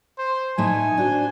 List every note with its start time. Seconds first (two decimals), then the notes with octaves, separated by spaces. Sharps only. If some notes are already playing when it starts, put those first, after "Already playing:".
0.18 C5
0.58 A2 A3 D#4 G#5
0.98 D4 F#4 C5